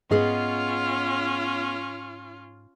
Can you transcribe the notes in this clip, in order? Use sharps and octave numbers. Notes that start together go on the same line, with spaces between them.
G#2 B3 C#4 F4 G#4 D#5